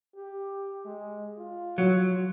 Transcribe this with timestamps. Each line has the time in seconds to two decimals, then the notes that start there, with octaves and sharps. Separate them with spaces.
0.16 G4
0.85 G#3
1.39 F4
1.78 F#3